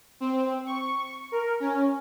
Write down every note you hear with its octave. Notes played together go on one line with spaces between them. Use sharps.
C4
C#6
A#4
C#4